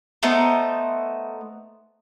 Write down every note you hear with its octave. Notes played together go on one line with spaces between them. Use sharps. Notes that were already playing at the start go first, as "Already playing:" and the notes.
A3 B3 D#4 C5